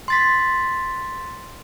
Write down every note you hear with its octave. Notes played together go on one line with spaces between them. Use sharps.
C6 A6 B6